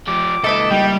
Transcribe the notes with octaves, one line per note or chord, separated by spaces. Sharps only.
F3 G4 D6
C#2 A#2 D#4 A4 B4 D#5
G3 G5